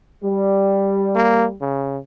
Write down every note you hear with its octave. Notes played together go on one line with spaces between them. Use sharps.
G3
A#3
C#3